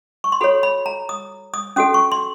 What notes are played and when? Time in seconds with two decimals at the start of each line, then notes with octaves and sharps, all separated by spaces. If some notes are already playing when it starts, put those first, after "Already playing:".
0.24 C#6
0.32 C6
0.41 F#4 A4 C#5 B5
0.63 B5
0.86 A#5
1.09 D#6
1.54 D#6
1.76 C#4 F#4 A4 D#6
1.94 C#6
2.12 C6